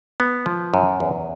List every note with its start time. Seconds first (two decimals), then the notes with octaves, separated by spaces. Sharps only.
0.20 B3
0.46 F3
0.74 F#2
1.00 E2